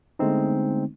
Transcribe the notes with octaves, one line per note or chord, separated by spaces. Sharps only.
D3 G#3 A3 B3 C4 D#4